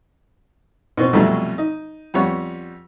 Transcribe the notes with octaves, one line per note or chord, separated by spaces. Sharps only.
B2 E3 B3 C4
C2 F2 B2 F#3 G3 A3
D#4
F2 G3 B3 C#5 F#5